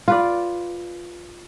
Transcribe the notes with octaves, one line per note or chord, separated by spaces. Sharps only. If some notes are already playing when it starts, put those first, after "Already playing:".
F4 B4 D5